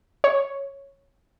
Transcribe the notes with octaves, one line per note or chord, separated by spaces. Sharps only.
C#5